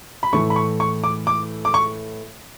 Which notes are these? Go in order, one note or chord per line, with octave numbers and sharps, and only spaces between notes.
B5
A2 E3 A3 C#6
B5
C#6
C#6
D6
D6
D6
C#6